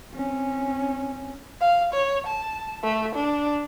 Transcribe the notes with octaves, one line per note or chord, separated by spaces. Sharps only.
C4 C#4
F5
C#5
A5
A3
D4